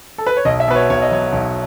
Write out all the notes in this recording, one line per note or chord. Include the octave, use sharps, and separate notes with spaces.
A4
B4
C#5
B1 D#5
E5
B2 B4
C#5
B1 C#5
D#5
F#3 C#5
B1